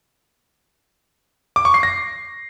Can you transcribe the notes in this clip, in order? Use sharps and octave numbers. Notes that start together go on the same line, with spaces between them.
D6
C#6
C7
A#6